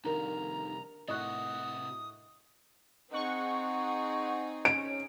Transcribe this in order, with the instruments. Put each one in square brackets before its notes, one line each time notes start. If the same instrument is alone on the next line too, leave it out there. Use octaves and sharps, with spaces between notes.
[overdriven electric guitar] C2 F2 [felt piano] D#3 [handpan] D4 A#4 [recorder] A#5
[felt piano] A2 C#6 F#6 [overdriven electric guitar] C3 F#4 [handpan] D#5 [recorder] D#6
[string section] C4 D#4 G#4 [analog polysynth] F#5 C#6
[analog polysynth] C#4 [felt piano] D7